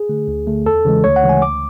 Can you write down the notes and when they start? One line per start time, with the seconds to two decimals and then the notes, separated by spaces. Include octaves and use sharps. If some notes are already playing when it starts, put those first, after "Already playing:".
Already playing: G#4
0.09 D3 A3
0.28 D2
0.47 D3 A3
0.66 E2 A4
0.85 C#3 E3 G#3
1.04 D2 C#5
1.16 F#5
1.23 C#3 E3 G#3
1.29 G#5
1.42 D2 D6